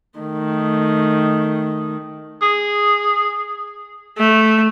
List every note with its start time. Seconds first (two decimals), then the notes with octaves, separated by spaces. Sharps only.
0.20 D#3 A3
2.42 G#4
4.18 A3